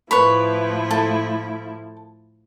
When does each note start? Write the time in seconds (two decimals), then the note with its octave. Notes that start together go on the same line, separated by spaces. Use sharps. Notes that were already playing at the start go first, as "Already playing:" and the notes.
0.11 A2 F3 E4 B4 C#5 B5
0.91 A4